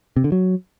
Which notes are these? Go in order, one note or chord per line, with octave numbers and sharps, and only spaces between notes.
C3
D3
F#3